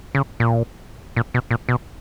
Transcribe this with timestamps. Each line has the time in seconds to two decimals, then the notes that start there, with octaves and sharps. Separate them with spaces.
0.15 C#3
0.40 A#2
1.16 A#2
1.34 B2
1.51 A#2
1.69 B2